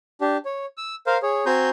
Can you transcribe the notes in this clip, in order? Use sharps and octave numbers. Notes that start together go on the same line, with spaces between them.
D4 G4
C#5
E6
A#4 C5 F5
G#4 C#5
C4 F#4 G#5 A#5 C6 G6